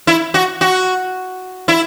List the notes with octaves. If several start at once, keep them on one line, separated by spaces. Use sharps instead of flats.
E4
F#4
F#4
E4